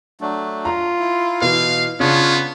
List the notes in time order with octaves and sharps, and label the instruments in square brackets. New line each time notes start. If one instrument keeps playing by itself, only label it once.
[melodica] F#3 A3 D4
[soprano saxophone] F4 [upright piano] A#5
[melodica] E4
[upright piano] B2 E3 [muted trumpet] F5
[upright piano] C#3 [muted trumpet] B3 [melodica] D4 C#5 [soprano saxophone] F4